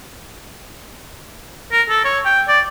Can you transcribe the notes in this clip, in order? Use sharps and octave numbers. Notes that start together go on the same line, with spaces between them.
A#4
A4
C#5
G5
D5